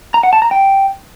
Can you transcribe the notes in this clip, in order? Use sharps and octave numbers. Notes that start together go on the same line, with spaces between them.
A#5
F#5
A5
A#5
G5